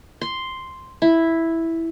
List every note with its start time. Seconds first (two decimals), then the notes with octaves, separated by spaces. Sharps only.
0.21 C6
1.02 E4